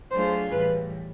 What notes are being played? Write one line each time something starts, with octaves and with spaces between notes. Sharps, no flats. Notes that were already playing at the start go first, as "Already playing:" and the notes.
F#3 A3 D4 F4 G#4 C5
A2 E3 G3 B4